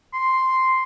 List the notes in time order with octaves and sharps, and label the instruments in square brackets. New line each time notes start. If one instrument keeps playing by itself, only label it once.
[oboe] C6